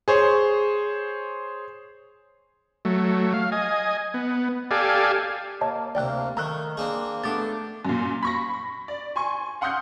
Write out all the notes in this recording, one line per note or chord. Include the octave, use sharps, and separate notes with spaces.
G#4 C5 C#5
F#3 A3
F5
D#5 G#5
B3
G4 A4 D5 F5 G#5
A#3 C#5 D#5 A5
D2 C3 A#3 D5 G5 F#6
D#3 A3 A#5 E6 F#6
A#3 C4 D4 G#4
A3 B3 D4 G4 D6 A6
F#2 A#2
B5 C#6 A#6
D5
G#5 C6 C#6
F5 F#5 C6 D#6 F6 G6